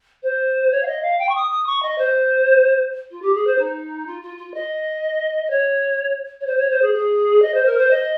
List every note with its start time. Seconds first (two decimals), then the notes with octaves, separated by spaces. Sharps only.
0.23 C5
0.71 C#5
0.83 F5
0.87 D#5
1.02 F5
1.19 G5
1.29 C#6
1.35 D#6
1.50 D#6
1.66 C#6
1.82 D#5
1.98 C5
3.11 F4
3.22 G4
3.34 G#4
3.47 C5
3.58 D#4
4.07 F4
4.22 F4
4.38 F4
4.54 D#5
5.46 D#5
5.50 C#5
6.40 C#5
6.46 C5
6.58 C#5
6.70 C5
6.82 G#4
6.94 G#4
7.42 D#5
7.54 C5
7.65 A#4
7.77 C5
7.90 D#5